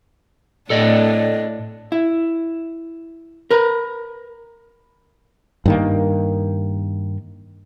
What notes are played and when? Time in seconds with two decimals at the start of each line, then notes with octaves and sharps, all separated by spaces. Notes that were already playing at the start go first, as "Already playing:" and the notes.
0.70 A2 D4 A4 D5 D#5
1.92 E4
3.51 A#4 B4
5.66 G2 D#3 A#3